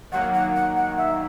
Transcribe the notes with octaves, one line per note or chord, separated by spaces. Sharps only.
D#3 F#3 A#3 F#5
F#5
F#5
F#5
E5